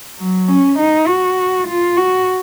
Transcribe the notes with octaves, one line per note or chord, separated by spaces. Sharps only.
F#3
C#4
D#4
F#4
F4
F#4